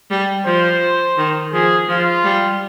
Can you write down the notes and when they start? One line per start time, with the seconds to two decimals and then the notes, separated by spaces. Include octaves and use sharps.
0.11 G3
0.46 F3 C5
1.18 D#3
1.52 F3 G#4
1.88 F3 F4
2.24 G3